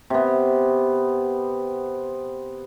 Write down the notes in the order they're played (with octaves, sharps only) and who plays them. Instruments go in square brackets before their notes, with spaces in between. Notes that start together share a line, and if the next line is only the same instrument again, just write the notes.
[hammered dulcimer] C3 B3